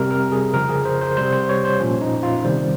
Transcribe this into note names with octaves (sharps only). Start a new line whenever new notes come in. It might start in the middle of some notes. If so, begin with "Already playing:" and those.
Already playing: C3 G3 A#4
A#4
G#4
C#3 F3 A#4
G#4
C5
C5
C3 G3 C5
C5
C#5
C5
A#2 F3 C#4
D#4
F4
C3 D#3 G3 C5